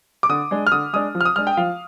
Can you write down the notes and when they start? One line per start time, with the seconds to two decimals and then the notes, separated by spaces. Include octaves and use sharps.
0.23 D6
0.29 D3 D#6
0.51 G#3 D4
0.67 F6
0.72 D3 D#6
0.93 G#3 D4 D#6
1.15 F3
1.21 F6
1.25 D#6
1.36 G#3 D4 F6
1.47 G5
1.57 F3 F5